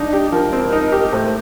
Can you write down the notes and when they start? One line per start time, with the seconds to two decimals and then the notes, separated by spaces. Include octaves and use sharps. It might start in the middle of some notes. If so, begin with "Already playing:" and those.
Already playing: F3 D4 D#4
0.13 G4
0.32 F3 A#4
0.53 C4
0.73 D#4
0.92 G4
1.12 A2 C5